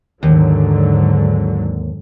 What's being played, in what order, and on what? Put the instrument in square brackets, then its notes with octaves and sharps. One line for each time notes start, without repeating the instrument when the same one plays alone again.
[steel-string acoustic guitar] D#2 [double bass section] G#2 D3 F#3